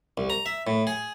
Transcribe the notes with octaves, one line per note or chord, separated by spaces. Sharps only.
C2
A#5
E5
A2
G#4